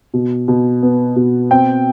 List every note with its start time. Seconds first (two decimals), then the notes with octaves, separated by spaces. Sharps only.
0.14 B2
0.48 B2
0.83 B3
1.16 B2
1.51 C4 G5